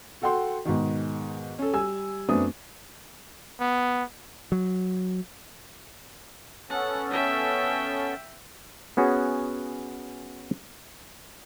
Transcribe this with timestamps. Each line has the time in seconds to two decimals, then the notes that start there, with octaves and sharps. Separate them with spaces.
0.22 F#4 A4 F#5 G5 C6
0.65 G#2 B2 D#3
1.59 C#4 A4
1.73 G3 G#5 E6
2.28 F#2 A3 B3 C4 D4 D#6
3.60 B3
4.52 F#3
6.70 B3 C#4 A4 F#5
7.11 E5 G5
8.97 B3 C#4 F#4 G#4 C#5